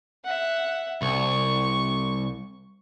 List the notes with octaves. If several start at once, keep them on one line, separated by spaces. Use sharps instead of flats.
E5 F#5
C2 C#6